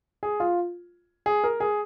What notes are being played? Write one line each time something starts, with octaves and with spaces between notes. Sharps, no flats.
G#4
F4
G#4
A#4
G#4